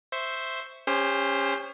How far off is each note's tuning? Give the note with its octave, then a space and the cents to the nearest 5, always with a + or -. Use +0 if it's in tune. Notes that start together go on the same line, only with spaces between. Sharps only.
C5 +0 E5 +0 C#6 +0
C#4 +0 G4 +40 C5 +0